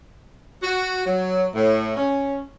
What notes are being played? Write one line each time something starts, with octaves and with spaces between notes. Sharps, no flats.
F#4
F#3
A2
C#4